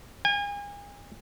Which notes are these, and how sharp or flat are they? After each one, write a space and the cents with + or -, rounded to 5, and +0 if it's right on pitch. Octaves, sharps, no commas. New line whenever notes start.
G#5 -35